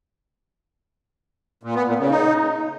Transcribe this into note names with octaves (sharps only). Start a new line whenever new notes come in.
A#2
B3
A#2
C#3
D#4